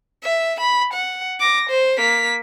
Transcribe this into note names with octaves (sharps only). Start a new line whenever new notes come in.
E5
B5
F#5
D6 A#6
C5
A#3 B6